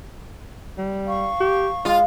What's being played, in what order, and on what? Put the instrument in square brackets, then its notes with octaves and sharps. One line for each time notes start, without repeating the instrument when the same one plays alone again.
[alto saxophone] G3
[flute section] F5 C#6
[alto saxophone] G4
[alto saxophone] G#3 [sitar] F4